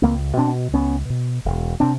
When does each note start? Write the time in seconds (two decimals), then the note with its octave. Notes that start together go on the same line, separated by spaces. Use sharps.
0.02 C#2 A#3 C4
0.37 B2 C4 D4
0.73 C#2 B3 C#4
1.09 B2
1.45 E1
1.80 C3 C4 D4